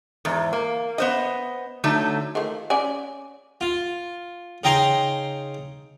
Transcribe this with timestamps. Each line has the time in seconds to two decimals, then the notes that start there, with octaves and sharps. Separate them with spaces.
0.25 E2 G#2
0.53 A#3
0.98 B3 C5 D#5
1.84 D3 F#3 A3 D#4
2.35 D#3 F3 A3
2.70 C#4 D5 G#5
3.61 F4
4.64 C#3 D#4 G5 A#5 C6